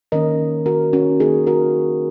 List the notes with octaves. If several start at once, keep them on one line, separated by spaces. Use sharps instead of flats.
D#3 A#3 C#4 A#4 D#5
F#4 A#4
C#4 F#4
D#3 A#3 C#4 D#4 G#4
F#4 A#4